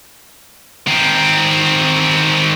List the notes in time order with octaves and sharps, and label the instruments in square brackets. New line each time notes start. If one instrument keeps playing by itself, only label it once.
[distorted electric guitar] D#3 C4